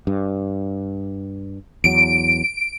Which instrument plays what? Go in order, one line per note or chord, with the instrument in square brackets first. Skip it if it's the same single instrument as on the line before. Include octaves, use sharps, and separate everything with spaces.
[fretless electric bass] G2
[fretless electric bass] E2 F#3 [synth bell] D7